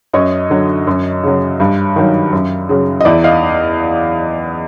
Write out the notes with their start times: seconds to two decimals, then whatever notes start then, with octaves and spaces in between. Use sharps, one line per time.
0.14 F#2 C#5 D#5
0.50 D3 F#3
0.87 F#2
1.23 C#3 F#3
1.60 G2
1.96 D#3 F#3
2.33 F#2
2.69 C#3 F#3
3.01 D#5
3.05 E2 D5 E5
3.24 D#5 F5